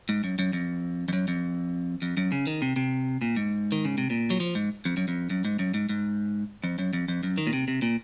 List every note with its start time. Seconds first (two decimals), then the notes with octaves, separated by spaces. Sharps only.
0.09 G#2
0.24 F#2
0.39 F#2
0.53 F2
1.08 F2
1.13 F#2
1.28 F2
2.02 F2
2.17 F#2
2.32 C#3
2.47 D#3
2.62 C3
2.76 C3
3.21 A#2
3.36 G#2
3.72 D#3
3.85 C#3
3.98 C3
4.10 A#2
4.30 F#3
4.40 F3
4.55 G#2
4.85 F2
4.97 F#2
5.08 F2
5.30 F#2
5.45 G#2
5.59 F#2
5.74 G#2
5.89 G#2
6.64 F2
6.79 F#2
6.93 F2
7.08 F2
7.23 F#2
7.38 D#3
7.47 A#2
7.53 C3
7.68 C3
7.82 A#2